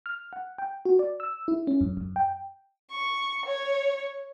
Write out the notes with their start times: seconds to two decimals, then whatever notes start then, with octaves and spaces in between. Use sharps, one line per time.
0.06 F6
0.33 F#5
0.58 G5
0.85 F#4
0.99 D5
1.20 E6
1.48 E4
1.67 C#4
1.81 F#2
1.97 F#2
2.16 G5
2.91 C#6
3.46 C#5